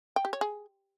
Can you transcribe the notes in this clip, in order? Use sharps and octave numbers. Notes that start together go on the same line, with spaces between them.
G5
G4
C#5
G#4